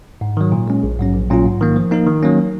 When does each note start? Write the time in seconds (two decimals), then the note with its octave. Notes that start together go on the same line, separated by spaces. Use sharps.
0.21 G#2
0.37 D#3 F#3
0.52 A#2
0.68 G#3 C#4
0.83 A#1
0.99 G#2 F#3 C#4
1.14 A#1
1.30 A#2 F#3 C#4 F4
1.45 G#2
1.61 D#3 A#3
1.76 F3
1.91 A#3 D#4 A#4
2.07 D#3
2.22 F#3 A#3 C#4